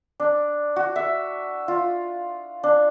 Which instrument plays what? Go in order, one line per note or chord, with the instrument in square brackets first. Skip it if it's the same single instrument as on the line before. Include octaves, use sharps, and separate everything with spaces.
[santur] D4
F#4
E5
F4
D4